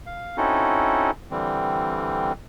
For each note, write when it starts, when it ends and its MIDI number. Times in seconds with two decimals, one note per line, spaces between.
0.06 0.37 77
0.37 1.11 60
0.37 1.11 61
0.37 1.11 63
0.37 1.11 64
0.37 1.11 66
0.37 1.11 69
1.31 2.33 50
1.31 2.33 52
1.31 2.33 55
1.31 2.33 60